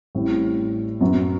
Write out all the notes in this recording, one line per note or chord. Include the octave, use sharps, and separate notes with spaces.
A1 A2 G3 C4
F#2 F#3 B3 F#4